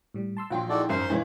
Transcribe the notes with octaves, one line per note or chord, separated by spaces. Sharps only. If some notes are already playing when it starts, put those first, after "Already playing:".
A2 G3
A5 C6 E6
A#1 F#3 F4 F#5 G5 C6
D#4 E4 F#4 G#4 A4 D5
G#1 F#2 A#4 C5 E5 C6
B1 E3 G#3